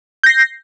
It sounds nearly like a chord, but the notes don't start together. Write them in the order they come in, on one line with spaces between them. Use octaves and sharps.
G6 A#6 C7